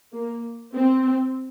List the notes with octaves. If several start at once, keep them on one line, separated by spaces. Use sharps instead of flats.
A#3
C4